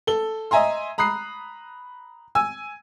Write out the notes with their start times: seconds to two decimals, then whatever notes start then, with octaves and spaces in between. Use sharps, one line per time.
0.07 A4 G7
0.51 D#5 E5 G#5 A#5 C6
0.98 A#5 B5 D#6 F#6 C7
2.35 G#5 E6